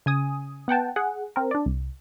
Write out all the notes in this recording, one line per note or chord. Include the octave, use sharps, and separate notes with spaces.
C#3 G#5 D#6
B3 F#5 G5 A5
G#4 F#5
C4 A#4
D4 D5
C2